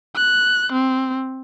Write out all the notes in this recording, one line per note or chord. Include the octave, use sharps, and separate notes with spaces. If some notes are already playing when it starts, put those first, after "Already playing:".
F#6
C4